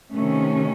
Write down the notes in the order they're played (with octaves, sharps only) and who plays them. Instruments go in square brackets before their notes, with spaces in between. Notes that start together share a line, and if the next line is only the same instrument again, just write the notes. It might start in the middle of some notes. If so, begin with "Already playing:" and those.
[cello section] C3 D#3 A3 C#4